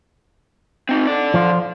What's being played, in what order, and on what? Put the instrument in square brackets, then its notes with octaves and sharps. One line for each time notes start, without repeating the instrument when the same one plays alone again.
[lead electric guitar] C4 D#4
A4 D5
[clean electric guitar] F3 F4